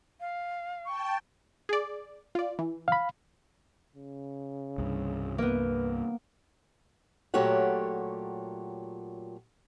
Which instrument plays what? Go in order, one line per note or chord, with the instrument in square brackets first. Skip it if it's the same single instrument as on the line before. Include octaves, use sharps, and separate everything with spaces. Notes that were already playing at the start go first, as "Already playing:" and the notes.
[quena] F5
[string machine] G5 A5 [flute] C#6
[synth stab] G#4 D5
F4 D5
E3
[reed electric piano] F5 B5
[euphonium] C#3
[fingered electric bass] C2 G2
[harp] A#3 B3 [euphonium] B4
[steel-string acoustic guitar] A#2 F#3 A3 G4 C#5 F#5